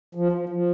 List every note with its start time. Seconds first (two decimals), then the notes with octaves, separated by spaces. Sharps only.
0.15 F3
0.32 F3
0.49 F3